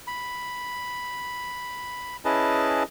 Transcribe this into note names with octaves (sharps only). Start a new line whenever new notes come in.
B5
C#4 E4 G#4 B4 D#5 A5